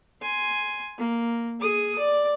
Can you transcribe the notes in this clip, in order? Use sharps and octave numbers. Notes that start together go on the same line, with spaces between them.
G#5 C6
A#3
G#4 D#6
D5